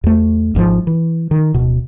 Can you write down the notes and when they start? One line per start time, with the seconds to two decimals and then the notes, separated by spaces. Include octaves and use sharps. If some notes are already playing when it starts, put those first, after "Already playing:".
0.04 E2 A3
0.55 G#1 G#2 D#3 F3
0.87 E3
1.31 D#3
1.54 D1 B2